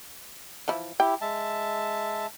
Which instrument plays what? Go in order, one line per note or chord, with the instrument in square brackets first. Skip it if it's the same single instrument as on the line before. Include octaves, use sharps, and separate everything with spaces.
[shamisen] E3 F3 E4
[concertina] E4 G4 [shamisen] G5
[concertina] G#3 E5 A5